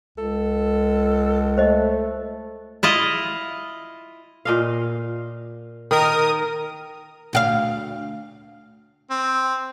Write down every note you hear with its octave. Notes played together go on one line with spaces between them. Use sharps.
C#2 A4
A3 C5 D#5
E4 F4 D#5
A#2 D#5 F5
D#3 A#4 D#6
D2 F#4 F5
C4